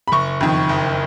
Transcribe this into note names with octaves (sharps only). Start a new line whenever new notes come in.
B5
F#1 C#6
F2 D#3
F#1